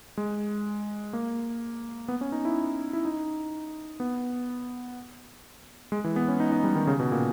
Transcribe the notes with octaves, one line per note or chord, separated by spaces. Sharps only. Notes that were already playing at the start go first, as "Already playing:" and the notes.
G#3
A#3
B3
C#4
D#4
E4
E4
D#4
B3
G#3
E3
B3
C#4
D#4
D#4
G3
D#3
C#3
B2
A#2